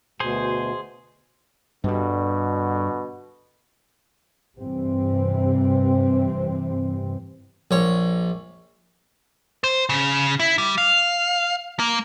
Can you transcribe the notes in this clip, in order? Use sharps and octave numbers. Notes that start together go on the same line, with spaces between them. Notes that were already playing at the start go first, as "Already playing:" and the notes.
D2 B2 G#4 C5
G2 B2 D3 G3
G2 C3 E3 C4
A#1 C#5
C5
C#3
E4
G3
F5
A#3